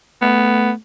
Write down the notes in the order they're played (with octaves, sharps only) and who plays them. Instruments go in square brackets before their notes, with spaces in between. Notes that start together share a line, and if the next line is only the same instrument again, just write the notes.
[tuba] A3 [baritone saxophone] B3